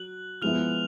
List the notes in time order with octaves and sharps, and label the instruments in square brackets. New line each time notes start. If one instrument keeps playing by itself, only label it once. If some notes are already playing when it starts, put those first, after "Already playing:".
Already playing: [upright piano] F#3 [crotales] F#6 F#7
[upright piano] F3 G#3 B3 E4 [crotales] F6 F7